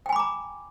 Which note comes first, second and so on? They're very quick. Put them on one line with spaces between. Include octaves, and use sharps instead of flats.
G5 G#5 B5 D6 A#5